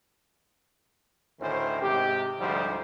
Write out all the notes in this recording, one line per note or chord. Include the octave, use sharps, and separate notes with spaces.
D2 A2 D#3 C#4 C5
G#2 C3 G4
D2 G#2 F3 G3 C5